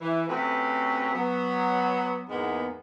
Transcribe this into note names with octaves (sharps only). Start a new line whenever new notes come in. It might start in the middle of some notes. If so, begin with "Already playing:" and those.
E3
C3 A3 C4 C#4 F#4 B4
F#3 B3
E2 G#2 G#3 A#3 B3